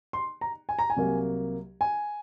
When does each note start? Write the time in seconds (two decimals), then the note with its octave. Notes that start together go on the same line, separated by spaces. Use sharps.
0.13 C6
0.41 A#5
0.69 G#5
0.79 A#5
0.90 G#5
0.97 C2 C3 F#3 A#3
1.81 G#5